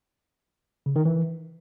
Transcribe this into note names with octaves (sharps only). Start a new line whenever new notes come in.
C#3
D#3
E3